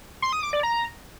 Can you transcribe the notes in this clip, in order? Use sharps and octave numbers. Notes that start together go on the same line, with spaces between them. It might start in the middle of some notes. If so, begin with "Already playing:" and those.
C6
D#6
D6
D5
A#5